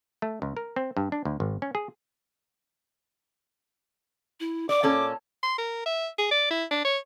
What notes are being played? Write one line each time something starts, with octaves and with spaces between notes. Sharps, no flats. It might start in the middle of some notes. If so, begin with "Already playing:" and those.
A3
C#2
A#4
C4
G2
D4
D2
G#1
C#4
G#4
E4
D5 D6
A#2 C#4 A4
C6
A#4
E5
G#4
D5
E4
D4
C#5